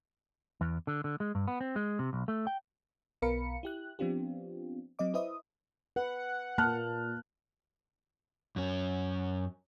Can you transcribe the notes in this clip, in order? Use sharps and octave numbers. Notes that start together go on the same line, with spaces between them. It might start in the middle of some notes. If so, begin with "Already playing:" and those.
E2
D3
D3
G#3
G2
B3
C4
G#3
C3
B1
A3
G5
B1 B3 A#4 F5 B5 C#7
E4 G4 F#6
F3 B3 C4 D4 F4 G4
F#3 C4 D#5 D6
E4 B4 C5 D#5 E5 D#6
B4 F#5
A#2 A#3 A5 F6 F#6
F#2 C#4